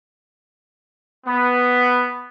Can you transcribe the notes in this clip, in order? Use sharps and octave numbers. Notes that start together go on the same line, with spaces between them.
B3